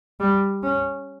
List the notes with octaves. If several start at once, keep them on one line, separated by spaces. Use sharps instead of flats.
G3
C#4